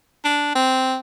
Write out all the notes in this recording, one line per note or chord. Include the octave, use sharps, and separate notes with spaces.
D4
C4